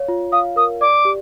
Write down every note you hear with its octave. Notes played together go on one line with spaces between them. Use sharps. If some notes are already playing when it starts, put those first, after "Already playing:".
Already playing: C#5 F5
F4
F5 D#6
A#4 D#6
D5 D6
G4